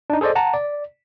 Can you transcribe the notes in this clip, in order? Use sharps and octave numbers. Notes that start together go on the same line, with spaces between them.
D4 D#4
G#4 A4 C5 D5 D#5
F#5 A5 A#5
D5